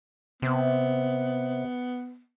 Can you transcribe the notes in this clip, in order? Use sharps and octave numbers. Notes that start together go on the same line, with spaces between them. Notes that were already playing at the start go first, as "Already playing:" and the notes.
C3 B3